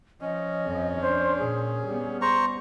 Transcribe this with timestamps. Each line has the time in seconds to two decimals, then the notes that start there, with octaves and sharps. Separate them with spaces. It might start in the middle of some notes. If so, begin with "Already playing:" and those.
0.21 F3 C#4 D#5
0.66 F2 F3
1.01 D4 C5
1.38 A#2 G#4
1.87 G3 B3
2.21 C5 A#5 C#6